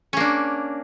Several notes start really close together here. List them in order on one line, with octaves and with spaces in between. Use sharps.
C#4 A#3 D4